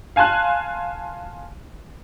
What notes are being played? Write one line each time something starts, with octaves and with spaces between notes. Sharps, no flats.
F5 G#5 A5 C6 F#6